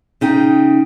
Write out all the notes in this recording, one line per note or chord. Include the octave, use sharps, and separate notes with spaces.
C#3 D#4 G5